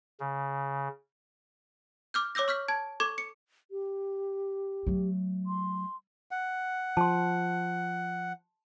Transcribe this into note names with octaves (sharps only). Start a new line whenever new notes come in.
C#3
D6 F6 G6
C#5 D6 E6 G6 A#6
C#6 F6 G6 B6
A5 G#6
A4 C#6 D6 G#6
C#7
G4
F#3 A3
C6
F#5
F3 A5 C6